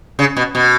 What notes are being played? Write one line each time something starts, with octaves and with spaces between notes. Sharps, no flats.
C#3
B2
B2